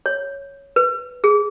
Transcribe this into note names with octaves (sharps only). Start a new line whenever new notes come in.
C#5
B4
G#4